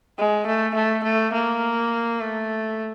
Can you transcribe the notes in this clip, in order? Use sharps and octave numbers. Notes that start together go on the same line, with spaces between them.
G#3
A3
A3
A3
A#3
A3